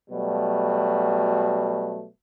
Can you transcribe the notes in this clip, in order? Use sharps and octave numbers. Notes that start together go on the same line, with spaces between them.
B2 F#3 G3 A3